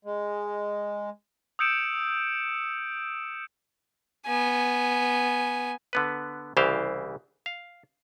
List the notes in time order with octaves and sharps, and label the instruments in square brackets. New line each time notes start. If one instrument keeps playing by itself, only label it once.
[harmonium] G#3
[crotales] D#6 E6 G6 C#7 D7 E7
[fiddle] B3 G#5
[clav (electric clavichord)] D3 B3 B4
C2 C#3 E3 G4 C5 F5
F5